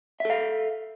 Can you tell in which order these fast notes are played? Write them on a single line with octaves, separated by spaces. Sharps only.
E5 A4 F5